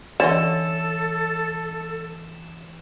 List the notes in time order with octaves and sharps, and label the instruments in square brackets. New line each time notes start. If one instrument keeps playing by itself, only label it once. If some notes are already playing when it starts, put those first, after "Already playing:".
[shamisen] D3 C#4 D#5 [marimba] E3 C#5 A6 [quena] A4 [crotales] E7